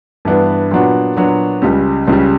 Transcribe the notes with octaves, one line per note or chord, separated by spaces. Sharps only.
G2 E3 B3 D4
A#2 F#3 B3 D4 F#4
A#2 F#3 B3 D4 F#4
C#2 C#3 G3
C#2 C#3 G3